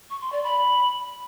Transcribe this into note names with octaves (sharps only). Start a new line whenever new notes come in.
C#6
C6
D5
B5